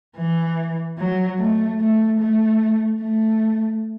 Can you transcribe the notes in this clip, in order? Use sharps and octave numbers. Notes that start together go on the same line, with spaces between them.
E3
F#3
A3
A3
A3
A3